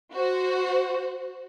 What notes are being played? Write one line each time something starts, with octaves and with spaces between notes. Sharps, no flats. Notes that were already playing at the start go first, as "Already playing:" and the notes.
F#4 C5